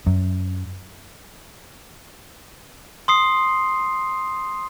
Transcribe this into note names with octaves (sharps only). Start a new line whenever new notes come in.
F#2
C6 D#6 C7